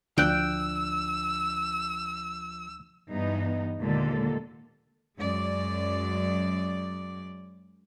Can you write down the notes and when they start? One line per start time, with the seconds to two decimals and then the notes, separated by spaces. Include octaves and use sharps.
0.18 D2 F3 D4 G5 E6 F#6
3.10 G2 E3 B3 D#4
3.80 D#2 A#2 D3 G#3 A#3 A4
5.18 F#2 G#3 D5